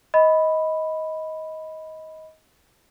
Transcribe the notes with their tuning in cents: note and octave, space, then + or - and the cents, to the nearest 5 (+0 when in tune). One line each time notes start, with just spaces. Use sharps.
D#5 +20 B5 +0